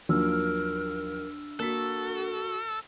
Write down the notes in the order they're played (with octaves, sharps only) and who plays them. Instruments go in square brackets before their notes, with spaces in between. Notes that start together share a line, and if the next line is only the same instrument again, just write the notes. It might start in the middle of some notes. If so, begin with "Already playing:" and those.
[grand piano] D#2 F3 F#3 [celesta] D4 E6 F6 [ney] A#4
[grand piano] A#3 B6 [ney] F#4 [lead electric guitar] A4